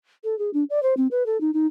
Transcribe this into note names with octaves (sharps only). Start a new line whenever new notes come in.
A4
G#4
D4
D5
C5
C4
B4
A4
D#4
D#4